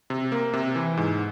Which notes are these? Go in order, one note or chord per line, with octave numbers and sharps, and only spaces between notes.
C3
A#3
C3
E3
G#2